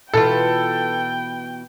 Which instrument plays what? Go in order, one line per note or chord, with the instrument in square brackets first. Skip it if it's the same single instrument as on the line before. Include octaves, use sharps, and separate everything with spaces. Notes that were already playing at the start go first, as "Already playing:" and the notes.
[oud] B2 E3 F4 [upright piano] A4 [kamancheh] G5